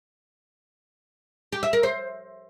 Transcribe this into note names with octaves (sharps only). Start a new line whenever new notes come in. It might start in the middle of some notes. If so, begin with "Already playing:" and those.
G4
E5
A#4
C5